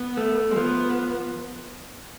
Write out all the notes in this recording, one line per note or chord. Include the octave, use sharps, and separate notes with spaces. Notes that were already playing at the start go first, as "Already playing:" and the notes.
Already playing: B3
A3
G#3
F3 B3